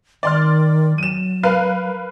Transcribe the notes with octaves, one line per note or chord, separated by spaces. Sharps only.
D#3 D5 C6 F6
F#3 D#7 E7
A#4 B4 F5